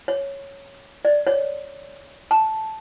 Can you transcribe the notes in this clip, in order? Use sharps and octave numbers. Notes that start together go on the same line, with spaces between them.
C#5
D5
C#5
A5